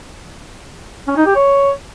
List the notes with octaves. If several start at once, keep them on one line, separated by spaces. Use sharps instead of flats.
C#4
D#4
G4
C#5